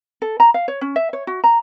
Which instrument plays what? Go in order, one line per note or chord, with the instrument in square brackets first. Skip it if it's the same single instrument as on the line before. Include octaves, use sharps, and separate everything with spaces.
[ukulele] A4
A#5
F5
C#5
C#4
E5
C#5
F#4
A#5